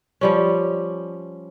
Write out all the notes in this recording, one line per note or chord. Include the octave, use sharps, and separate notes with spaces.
F3 G3 C#4